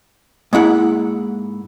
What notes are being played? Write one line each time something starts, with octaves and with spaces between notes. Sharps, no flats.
G#2 A#3 E4 F#5